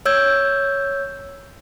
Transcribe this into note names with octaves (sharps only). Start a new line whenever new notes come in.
C#5 E6 G6 G#6